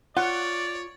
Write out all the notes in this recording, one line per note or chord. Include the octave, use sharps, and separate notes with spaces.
F4 C#5 D5 F#5